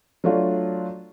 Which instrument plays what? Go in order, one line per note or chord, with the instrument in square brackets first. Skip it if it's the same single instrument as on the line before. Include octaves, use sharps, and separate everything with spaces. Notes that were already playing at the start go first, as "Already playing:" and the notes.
[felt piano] F#3 A3 D4 F4